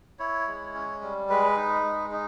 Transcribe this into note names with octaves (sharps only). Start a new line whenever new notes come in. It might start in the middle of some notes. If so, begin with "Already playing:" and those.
E4 C#5
G#3
C#4
G3
G#3 B4
D#4
G#3
D#4